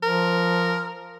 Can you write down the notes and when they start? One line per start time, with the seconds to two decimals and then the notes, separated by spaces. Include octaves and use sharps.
0.03 F3 A#4